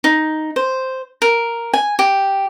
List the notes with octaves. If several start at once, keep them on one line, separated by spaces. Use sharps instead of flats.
D#4
C5
A#4
G#5
G4